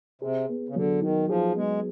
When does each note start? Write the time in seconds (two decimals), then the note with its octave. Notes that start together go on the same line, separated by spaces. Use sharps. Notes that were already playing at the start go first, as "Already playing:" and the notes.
0.21 C3 G#4
0.49 B3
0.69 C#3
0.76 D3 F#3
1.01 D#3 D#4
1.28 F3 G#4
1.56 G#3 B3